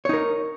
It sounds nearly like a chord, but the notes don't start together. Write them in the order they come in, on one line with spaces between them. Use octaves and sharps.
C#5 D#4 A#4